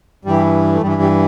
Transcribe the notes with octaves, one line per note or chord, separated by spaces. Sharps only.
G2 E3 G3
A3
G2 E3 G3
G3